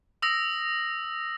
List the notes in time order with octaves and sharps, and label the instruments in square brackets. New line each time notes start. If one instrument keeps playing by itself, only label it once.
[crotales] D#6 E6 A#6